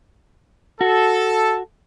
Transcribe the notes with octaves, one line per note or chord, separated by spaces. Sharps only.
F#4 A4